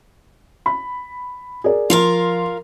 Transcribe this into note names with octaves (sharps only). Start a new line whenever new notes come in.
B5
G#4 A#4 D5
F3 F4 A#4 F5 C6